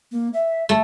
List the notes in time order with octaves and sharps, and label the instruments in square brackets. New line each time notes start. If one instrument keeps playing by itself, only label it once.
[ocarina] A#3
E5
[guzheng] A3